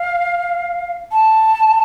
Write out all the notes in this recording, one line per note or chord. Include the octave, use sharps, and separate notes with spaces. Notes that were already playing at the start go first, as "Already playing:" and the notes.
Already playing: F5
A5